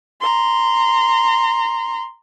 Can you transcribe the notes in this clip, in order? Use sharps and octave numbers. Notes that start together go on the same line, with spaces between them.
A#5 C6